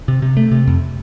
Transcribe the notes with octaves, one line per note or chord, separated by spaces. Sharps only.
C3
C3
A3
C3
F2